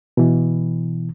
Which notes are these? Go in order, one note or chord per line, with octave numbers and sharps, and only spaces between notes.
B2 E3